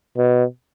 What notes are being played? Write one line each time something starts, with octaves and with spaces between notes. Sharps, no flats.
B2